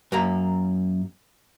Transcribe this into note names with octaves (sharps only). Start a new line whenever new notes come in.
F#2 A#3 A#5